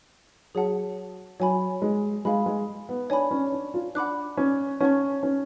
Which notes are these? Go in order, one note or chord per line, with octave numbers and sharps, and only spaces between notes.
F#3 G#4 C#5 F#5 A5
F#3 C#5 G#5 B5
G#3
G#3 F5 G#5 B5
G#3
B3
D4 C#5 G#5 B5
C#4
D4
F4
D4 F#5 B5 D6 F#6
C#4
C#4 C#5 F#5 A5 C#6
C#4